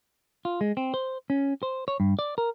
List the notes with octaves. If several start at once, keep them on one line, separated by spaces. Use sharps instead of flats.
F4
G#3
C4
C5
C#4
C5
C#5
G2
D5
A#4